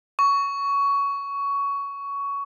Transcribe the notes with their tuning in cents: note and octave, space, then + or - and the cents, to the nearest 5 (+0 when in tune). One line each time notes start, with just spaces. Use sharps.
C#6 +15